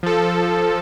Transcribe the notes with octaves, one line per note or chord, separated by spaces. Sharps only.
F3 A4